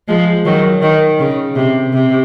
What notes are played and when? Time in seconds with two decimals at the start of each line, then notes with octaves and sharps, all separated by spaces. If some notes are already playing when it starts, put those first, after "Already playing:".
0.08 F3 G#3
0.45 D#3 F#3
0.82 D#3
1.19 C#3
1.56 C3
1.93 C3